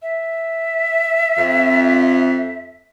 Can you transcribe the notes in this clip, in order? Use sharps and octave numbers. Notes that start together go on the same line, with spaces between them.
E5
F2